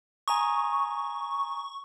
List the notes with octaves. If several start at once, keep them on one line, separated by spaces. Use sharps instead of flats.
G#5 A#5 C#6 D#6